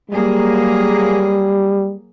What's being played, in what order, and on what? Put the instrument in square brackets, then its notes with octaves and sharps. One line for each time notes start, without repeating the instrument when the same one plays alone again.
[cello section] F#3 A#3 G#4 [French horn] G3